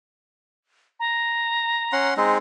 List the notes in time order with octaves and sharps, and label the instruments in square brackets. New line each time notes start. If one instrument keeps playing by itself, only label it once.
[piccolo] A#5
[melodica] C#4 F#5 C6
G#3 C4 D#4